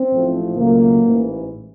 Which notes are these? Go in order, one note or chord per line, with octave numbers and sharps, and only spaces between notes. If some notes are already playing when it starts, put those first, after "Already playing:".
Already playing: C4
A1 G#2 F3 A3
C#2 B2 F#3 A3 A#3
A1 G#2 E3